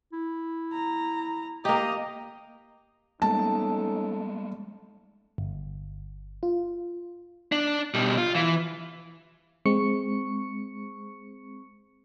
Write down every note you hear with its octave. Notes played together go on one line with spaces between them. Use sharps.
E4
A#5
A#3 G4 D#5 A#5
G3 G#3 A#3 C#4 D#4 A4 A5
G1
F4
D4
B2 G3
F4
E3
G#3 C4 C#6 C#7